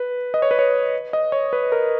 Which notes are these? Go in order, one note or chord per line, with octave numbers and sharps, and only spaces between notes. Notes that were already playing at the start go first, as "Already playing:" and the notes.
Already playing: B4
D#5
C#5
B4
C#5
D#5
C#5
B4
A#4